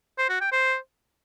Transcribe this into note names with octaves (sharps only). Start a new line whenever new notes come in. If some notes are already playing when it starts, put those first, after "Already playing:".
C5
F#4
G5
C5